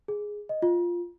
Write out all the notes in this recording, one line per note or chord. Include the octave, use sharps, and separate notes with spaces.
G#4
D#5
F4